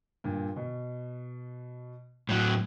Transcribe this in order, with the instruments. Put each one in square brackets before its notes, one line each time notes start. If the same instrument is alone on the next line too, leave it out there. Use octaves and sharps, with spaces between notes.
[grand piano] G2 A#2
B2
[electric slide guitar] A2 F#3